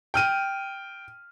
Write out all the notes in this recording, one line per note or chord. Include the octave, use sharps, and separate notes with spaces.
G5 F6 D#7